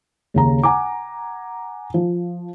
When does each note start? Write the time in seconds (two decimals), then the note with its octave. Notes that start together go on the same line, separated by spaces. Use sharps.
0.34 D#2 C#3 A#5
0.63 F#5 G#5 A#5 D6
1.94 F3